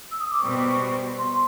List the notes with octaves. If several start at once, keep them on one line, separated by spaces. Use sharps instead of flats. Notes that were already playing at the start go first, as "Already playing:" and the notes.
E6
D#6
D6
B2 G3 C4 C#6
C6